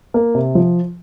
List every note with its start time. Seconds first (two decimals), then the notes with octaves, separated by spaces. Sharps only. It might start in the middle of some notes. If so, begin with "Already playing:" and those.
0.14 A#3
0.35 C3
0.55 F3